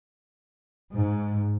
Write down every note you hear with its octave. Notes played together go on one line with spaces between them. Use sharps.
G#2